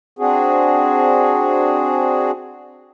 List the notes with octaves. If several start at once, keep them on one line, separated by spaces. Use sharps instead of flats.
C4 D4 F#4 G#4